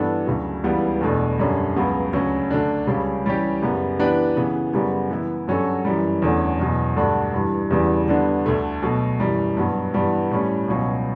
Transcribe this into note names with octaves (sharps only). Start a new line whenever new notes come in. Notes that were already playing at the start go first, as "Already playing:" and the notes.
Already playing: G2 E3 B3 D4 A4
D2 C#3 F#3
C#2 C#3 E3 G3 B3
E2 B2 A3 D4 A4
F#2 D3 G3 C#4
C#2 C#3 F#3 B3
D2 C#3 F#3 C#4
D3 A3 D4
C#2 C#3 G3 C#4
E3 G3 C#4 G4
F#2 C#3 G3 B3
E3 B3 D4 G4 B4
C#3 E3 B3
F#2 C#3 G3 B3 F#4
E3 B3 E4
G2 F#3 C#4 F#4 A4
F#2 E3 G3
E2 D3 A3 C#4 F#4
E2 B2 F#3
G2 D3 A3 D4 F#4
G2 E3 G3
E2 C#3 E3 G3 B3
D3 G3 B3 D4
D2 D3 A3
B2 F#3 A3
F#2 E3 G3
G2 F#3 B3
G2 E3 G3 B3 F#4
A2 G3 C#4
C#2 B2 F#3 C#4